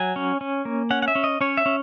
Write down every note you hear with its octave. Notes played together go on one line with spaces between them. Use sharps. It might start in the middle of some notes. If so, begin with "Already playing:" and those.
Already playing: F#3 G#5
C#4
C#4
A#3
C#4 F#5
F#5
E5
C#4
D#5
C#4 C#5
E5
C#4